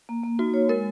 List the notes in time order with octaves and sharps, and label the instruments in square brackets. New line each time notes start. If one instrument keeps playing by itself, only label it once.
[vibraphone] A#3
A#3
[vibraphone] D#4 [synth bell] F#4
[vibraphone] C#5
[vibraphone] G#3 [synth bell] A#4